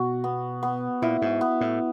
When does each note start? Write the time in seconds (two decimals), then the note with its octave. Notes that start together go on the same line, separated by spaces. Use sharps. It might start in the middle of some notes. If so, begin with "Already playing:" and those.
Already playing: B2 F#4
0.24 B3
0.63 B3
1.02 A#2 E4
1.22 G#2
1.41 B3
1.61 A2